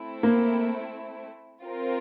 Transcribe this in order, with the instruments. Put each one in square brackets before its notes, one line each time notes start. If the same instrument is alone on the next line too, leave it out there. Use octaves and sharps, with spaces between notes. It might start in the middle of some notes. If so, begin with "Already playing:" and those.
Already playing: [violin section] A3 C4 E4
[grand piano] A#3
[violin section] C4 F4 A#4